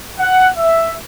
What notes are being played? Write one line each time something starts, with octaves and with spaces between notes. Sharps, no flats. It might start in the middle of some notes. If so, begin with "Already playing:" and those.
F#5
E5